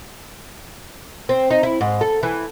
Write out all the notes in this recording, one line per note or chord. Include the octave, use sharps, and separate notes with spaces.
C4
D#4
E4
G#2
A4
E3